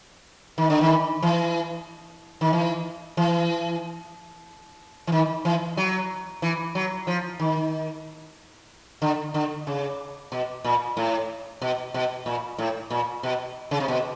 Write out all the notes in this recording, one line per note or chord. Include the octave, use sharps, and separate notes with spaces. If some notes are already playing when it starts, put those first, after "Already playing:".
D#3
D3
D#3
E3
D#3
E3
E3
E3
D#3
E3
F#3
E3
F#3
F3
D#3
D3
D3
C#3
B2
A#2
A2
B2
B2
A#2
A2
A#2
B2
C#3
C3
B2